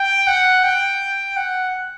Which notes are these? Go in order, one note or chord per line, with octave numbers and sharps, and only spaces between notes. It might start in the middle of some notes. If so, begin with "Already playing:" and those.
Already playing: G5
F#5
G5
F#5